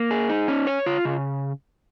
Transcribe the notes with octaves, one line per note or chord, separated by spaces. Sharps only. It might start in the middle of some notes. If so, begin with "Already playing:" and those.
Already playing: A#3
G#4
D#4
C#4
C#5
F4
C#3